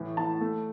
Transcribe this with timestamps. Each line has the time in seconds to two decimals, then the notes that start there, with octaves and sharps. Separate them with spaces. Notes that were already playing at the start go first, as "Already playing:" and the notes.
Already playing: A2 E3
0.17 E3 A5
0.41 A3